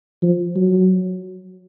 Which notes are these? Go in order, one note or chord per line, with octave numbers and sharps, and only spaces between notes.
F3
F#3